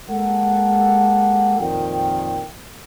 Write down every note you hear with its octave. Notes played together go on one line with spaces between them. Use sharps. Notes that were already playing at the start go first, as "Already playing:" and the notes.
G#3 A#3 G4 A4 F#5
F2 A#2 D#3 G5